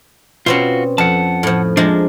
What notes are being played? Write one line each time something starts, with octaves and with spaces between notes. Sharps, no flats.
B2 C4 C#4 F4 F#4
F2 F#5 A5
A2 F3
F3 G#3 A#3 D4